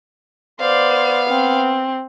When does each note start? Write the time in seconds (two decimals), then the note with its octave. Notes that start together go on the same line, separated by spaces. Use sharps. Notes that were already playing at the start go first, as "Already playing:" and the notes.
0.60 B3 C5 D5 F5
1.29 C4